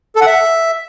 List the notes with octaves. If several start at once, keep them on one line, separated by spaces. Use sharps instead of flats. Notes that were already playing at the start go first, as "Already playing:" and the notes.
A4
F#5
E5